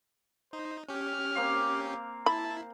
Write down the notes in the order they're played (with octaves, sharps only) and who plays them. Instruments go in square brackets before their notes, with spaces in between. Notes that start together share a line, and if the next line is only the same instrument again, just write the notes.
[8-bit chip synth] D#4 [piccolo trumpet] C5
[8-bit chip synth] C#4 G4 [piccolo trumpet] F6
[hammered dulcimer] A#3 C4 F5
[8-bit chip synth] E4 [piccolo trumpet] A5 [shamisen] B5